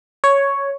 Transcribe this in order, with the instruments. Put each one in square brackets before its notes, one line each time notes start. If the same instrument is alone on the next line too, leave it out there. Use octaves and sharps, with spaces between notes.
[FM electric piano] C#5